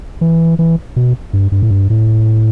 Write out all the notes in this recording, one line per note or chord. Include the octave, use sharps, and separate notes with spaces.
E3
E3
B2
G2
G2
A2
G2
A2